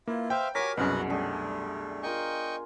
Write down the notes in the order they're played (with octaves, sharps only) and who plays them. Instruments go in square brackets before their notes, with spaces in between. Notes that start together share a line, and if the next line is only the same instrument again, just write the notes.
[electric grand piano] A#3 [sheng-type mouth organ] E4 F4 [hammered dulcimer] B4
[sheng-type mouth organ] C5 E5 F5 [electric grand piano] G5
[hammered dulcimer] F#4 G4 A#4 [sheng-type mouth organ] C#5 G#5 D6 [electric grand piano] A#6 B6
[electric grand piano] C2 F#2 [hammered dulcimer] B2 C#4 G#4 [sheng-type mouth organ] F#4 B4 F#5
[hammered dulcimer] G3 D4 G#4 [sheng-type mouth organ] A3
[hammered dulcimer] F4 A#4 G#5 [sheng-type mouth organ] D#5 G5 C#6